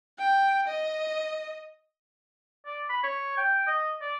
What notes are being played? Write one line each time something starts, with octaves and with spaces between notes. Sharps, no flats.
G5
D#5
D5
B5
C#5
G5
D#5
D5